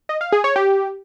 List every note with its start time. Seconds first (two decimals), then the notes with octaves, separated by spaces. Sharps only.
0.09 D#5
0.21 F5
0.32 G#4
0.44 C#5
0.56 G4